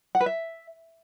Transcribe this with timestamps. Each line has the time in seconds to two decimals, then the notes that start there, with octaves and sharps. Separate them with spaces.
0.15 F#5
0.20 B4
0.26 E5